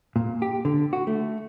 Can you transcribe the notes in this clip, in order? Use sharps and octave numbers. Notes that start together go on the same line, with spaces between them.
A#2
G4
D3
F#4
A3